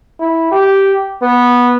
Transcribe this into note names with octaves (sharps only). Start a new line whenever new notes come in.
E4
G4
B3